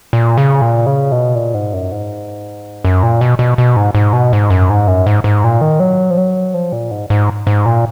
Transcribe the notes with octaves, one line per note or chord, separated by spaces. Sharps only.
A#2
C#3
A#2
C#3
B2
A#2
G#2
F#2
G#2
F#2
A#2
B2
B2
B2
G#2
G#2
B2
G#2
F#2
G#2
F#2
G#2
G#2
A#2
D#3
F#3
F3
F#3
F3
A#2
G#2
G#2
G#2
A#2